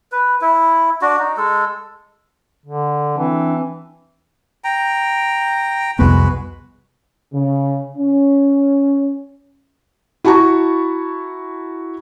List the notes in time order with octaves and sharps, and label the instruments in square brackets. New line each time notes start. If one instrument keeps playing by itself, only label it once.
[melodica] B4
E4
D4 F#4
D#4
G#3 A4
[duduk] D3
[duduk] E3 [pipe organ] C4 D4
[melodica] G5 A#5
[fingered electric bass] C2 F2 B3 [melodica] G#3 F#4 B4
[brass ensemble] C#3
C#4
[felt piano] E4 F#4 A5 A#5 C#6